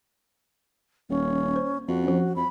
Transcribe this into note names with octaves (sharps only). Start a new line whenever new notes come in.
D#1 C#4
C5
F2 F#4
F3 C#4
F2 B5